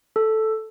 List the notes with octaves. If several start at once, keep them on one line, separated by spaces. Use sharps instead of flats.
A4